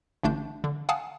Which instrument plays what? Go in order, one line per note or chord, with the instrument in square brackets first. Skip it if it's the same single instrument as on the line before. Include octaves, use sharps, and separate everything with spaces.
[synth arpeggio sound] A1 D3 A3 D4 G6
D3
F5 F#5 G#5 A5 D#6